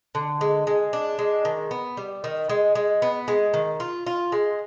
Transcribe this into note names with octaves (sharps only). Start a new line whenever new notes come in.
D3
G#3
G#3
D4
G#3
D#3
B3
G3
D#3
G#3
G#3
B3
G#3
D#3
F4
F4
G#3